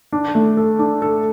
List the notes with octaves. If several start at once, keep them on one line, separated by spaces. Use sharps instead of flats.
D4
A3
A4
D4
A4